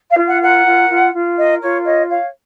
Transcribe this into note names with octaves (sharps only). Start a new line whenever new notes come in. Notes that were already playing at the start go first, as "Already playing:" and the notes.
F5
F4
F#5
A#4 F#5
F4
F4
F4
A#4 D#5
F4 C#5
C#5 D#5
C#5 F5